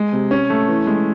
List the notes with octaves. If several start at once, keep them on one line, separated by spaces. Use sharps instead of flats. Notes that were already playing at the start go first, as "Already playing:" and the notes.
Already playing: G#3
C3
C#4
A3
E3
G#3